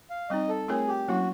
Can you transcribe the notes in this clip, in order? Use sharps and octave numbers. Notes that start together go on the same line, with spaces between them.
F5
G3 C4 D#4 D#5
A4
A3 C4 F4 G#4 A#4 C#5
G4
F#3 A#3 C#4 E4 F#4